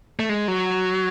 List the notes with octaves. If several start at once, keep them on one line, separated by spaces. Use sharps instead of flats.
A3
G#3
F#3